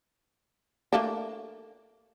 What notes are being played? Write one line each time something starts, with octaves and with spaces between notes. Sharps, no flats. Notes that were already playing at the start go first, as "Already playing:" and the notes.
A3 A#3 D4